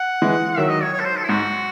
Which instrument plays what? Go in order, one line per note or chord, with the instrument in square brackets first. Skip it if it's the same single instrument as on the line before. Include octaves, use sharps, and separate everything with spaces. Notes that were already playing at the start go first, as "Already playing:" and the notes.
Already playing: [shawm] F#5
[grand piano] E3 G#3
[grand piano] D#3 F#3 [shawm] E5
[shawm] D#5
C#5
C#5
A4
C5
A4
E4
[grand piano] G#2 [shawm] F#4